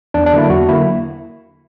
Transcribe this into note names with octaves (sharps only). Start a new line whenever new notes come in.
E2 D4
D4
D3 F#3 A#3 E4
E2 F#4
D3 F#3 A#3 E4